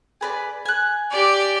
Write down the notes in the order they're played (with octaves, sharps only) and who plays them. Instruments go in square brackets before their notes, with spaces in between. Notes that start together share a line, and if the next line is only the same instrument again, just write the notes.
[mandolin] G#4 B4 D5
G#5 F#6
[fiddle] G4 D5